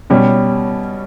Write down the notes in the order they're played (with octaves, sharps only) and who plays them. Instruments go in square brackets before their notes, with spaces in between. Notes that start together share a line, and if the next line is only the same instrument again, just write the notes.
[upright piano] B2 G3 C#4